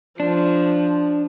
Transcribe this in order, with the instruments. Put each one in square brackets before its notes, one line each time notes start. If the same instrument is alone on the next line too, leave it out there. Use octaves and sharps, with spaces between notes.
[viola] F3 [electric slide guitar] D4